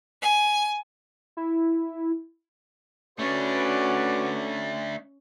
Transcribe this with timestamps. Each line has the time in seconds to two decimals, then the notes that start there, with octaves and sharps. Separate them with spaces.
0.21 G#5
1.37 E4
3.19 A3 C#4 D4 F#4 B4 D5